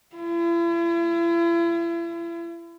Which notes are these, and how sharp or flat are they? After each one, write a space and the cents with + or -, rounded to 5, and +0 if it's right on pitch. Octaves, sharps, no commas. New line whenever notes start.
E4 +40